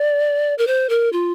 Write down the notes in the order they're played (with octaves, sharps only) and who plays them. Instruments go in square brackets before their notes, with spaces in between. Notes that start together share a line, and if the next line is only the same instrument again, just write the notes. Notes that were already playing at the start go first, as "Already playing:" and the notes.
Already playing: [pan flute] D5
A#4
C5
A#4
F4